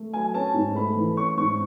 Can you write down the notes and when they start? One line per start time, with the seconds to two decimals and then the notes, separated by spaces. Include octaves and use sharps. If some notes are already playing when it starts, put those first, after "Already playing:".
Already playing: A3
0.13 F#3 G#5
0.34 C#4 A5
0.54 G#2
0.75 A3 B5
0.95 E3
1.16 C#4 C#6
1.37 G#2 C#6